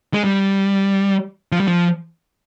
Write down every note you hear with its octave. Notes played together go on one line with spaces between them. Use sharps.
G#3
G3
F3
G3
F3